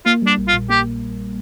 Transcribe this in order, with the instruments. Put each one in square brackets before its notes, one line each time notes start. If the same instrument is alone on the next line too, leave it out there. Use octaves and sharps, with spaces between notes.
[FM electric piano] A#3 [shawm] F4
[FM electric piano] G3 [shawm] D4
[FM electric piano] A#1
[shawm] F4
[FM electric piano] A#2
[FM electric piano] A#3 [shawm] G4